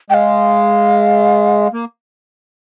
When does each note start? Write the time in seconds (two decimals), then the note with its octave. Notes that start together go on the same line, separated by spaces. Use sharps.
0.10 G#3 F5 G5
1.73 A#3